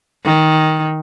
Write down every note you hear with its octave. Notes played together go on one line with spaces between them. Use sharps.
D#3